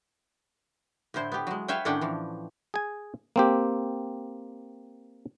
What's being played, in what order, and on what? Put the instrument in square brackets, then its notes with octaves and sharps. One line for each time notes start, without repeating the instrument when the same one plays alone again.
[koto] A2 D3 E4 C5
B3 G4
F#3 G#3
B4 C#5 E5 F5 G5
A2 D#3 C#4 D4 F#5 G5
E3 F3
[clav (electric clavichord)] G#4 G#5
A#3 C4 G4